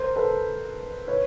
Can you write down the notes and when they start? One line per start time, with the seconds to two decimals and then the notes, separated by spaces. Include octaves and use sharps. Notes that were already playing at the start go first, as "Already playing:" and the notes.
Already playing: A#4 C5
0.16 A4 B4
1.08 B4 C#5